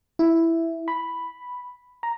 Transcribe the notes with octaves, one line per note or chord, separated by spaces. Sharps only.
E4
B5
A#5